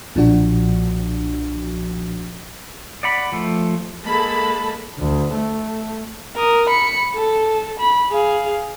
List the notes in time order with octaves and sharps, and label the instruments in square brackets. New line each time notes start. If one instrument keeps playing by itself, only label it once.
[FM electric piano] B1 A#2 F3 D4 F#4
[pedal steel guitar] D5 F#5 B5
F3 A3
[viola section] G#3 A#3 A4 A5 B5
[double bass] D2
A3
[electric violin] A#4 D#6
B5 C#7
A4
B5
G#4 F5